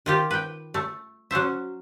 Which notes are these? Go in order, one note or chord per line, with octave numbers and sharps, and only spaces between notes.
D#3 F4 G4
B4 G5
A3
F#3 C#4 C5 E5